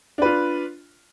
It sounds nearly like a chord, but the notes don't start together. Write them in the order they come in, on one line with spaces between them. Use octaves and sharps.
D4 B4 F4